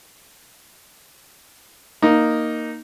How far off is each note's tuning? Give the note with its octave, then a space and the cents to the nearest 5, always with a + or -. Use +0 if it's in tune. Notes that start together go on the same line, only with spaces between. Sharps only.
A#3 +0 D#4 +0